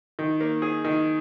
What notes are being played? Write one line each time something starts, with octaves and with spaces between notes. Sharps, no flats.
D#3
A#3
G#4
D#3